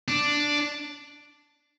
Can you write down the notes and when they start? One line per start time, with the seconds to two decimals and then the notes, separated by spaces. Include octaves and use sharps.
0.08 D4